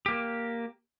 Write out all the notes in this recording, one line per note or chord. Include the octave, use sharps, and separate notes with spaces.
A#3 G4